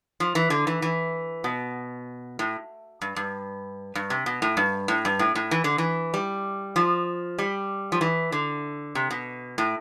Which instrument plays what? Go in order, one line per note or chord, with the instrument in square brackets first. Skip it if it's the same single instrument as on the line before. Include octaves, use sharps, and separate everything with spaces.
[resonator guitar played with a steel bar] F3
E3
D3
E3
E3
B2
A2
G2
G2
G2
C3
B2
A2
G2
A2
G2
A2
A2
E3
D3
E3
G3
F3
G3
F3
E3
D3
C3
B2
A2